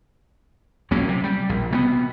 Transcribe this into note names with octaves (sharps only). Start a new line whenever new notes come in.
A#1 F#3 A#3 C#4
C3
G3
A#1
C3 A3 B3